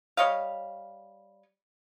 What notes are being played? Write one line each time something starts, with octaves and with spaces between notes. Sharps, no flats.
G3 C#5 D#5 F5